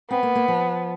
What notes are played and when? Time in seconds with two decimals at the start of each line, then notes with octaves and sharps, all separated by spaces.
0.10 B3 C4
0.23 A#3
0.35 A#3
0.48 F3